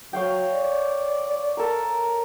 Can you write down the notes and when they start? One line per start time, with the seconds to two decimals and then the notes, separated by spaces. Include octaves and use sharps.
0.13 F#3 C#5 F5 G5
0.54 D5
1.57 A4 A#4